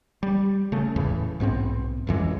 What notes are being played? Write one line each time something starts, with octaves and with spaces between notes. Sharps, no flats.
G3
C#3 A3
E2 A2 C#3 E3
B1 G#2 B3 C4
A1 F2 E3 G#3